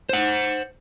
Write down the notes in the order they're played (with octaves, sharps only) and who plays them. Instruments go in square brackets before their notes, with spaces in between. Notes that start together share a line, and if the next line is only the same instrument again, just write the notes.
[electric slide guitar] C5 F#5